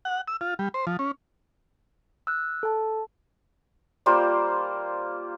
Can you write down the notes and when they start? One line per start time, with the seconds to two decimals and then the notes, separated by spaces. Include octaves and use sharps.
0.05 F#5
0.28 E6
0.41 F4
0.59 G3
0.74 C5
0.87 F3
0.99 C#4
2.27 E6 F#6
2.63 A4 A5
4.06 G3 A#3 F4 C5